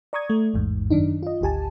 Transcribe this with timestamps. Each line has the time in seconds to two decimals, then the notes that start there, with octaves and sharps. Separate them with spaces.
0.13 D5 A#5 C#6 D#6 G#6
0.30 A3
0.54 A1 E2 G#2
0.90 F#2 D#3 D4 D#4
1.23 F4 D#5
1.41 G#1 D2 G4 G#5 A5